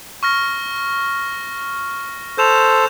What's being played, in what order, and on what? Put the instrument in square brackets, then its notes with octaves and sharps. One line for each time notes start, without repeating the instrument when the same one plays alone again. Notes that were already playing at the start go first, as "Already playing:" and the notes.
[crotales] C#6 F6 A#6
[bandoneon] A4 C5 [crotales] G6 E7 F7